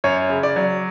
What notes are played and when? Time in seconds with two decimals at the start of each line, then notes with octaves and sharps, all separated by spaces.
0.04 F#2 C#5
0.30 C#3
0.43 D5
0.56 F#3